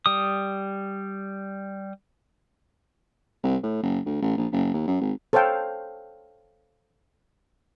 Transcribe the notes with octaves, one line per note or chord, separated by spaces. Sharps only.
G3 D#6
C2
A2
F#1
D2
A1
A#1
F#1
D#2
F#2
G#1
A4 C5 C#5 F5 G5